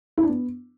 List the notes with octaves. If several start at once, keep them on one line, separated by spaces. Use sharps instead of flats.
E4
D4
B3